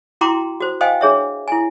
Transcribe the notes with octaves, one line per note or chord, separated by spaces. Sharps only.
E4 F#4 G5 A#5 C6 D6
F#4 C5
C5 D#5 F5 G5 G#5
D4 G#4 C#5 E5
E4 G#5